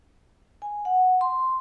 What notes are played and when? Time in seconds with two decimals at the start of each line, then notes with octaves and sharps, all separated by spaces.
0.62 G#5
0.85 F#5
1.21 C6